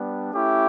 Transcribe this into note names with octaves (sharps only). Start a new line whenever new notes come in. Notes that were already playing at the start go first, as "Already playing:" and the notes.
Already playing: G3 B3 D4
A3 C#4 E4 G4